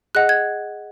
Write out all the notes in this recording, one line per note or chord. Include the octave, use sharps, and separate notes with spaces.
G#4 D#5 F#5 F#6
G#6